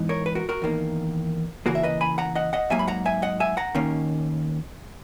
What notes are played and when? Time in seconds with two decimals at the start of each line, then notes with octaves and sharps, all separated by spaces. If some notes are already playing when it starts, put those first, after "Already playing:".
Already playing: G#2 E3 B3 D#4
0.09 A#4 C#5
0.26 B4
0.35 F#4 A#4
0.49 F#4 A#4
0.62 E2 D#3 A#3
1.66 C#3 E3 A#3 F#4 A#4
1.75 E5
1.83 B4 D#5
2.01 G#5 B5
2.18 F#5 A#5
2.35 D#5 F#5
2.53 D#5 F#5
2.70 G#2 F#3 A#3 E5 G#5
2.79 B5
2.88 F#5 A#5
3.05 E5 G#5
3.22 D#5 F#5
3.40 E5 G#5
3.57 F#5 A#5
3.75 D#2 D#3 A#3 C#4